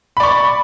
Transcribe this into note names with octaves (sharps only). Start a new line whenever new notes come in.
D5 B5 C#6